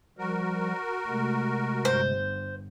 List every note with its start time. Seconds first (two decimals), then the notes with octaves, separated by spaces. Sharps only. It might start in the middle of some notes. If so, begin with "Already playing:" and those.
0.19 F3 G3 F#4 A#4
1.07 C3 G#3 A3
1.85 G1 C5